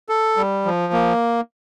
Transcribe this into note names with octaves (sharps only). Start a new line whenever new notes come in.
A4
G3
F3
A#3